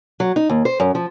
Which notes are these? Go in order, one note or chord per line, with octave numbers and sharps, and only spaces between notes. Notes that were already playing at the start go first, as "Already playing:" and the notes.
F#3
D#4
D#2
C5
F#2
F3